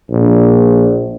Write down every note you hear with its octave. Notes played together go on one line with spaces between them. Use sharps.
A#1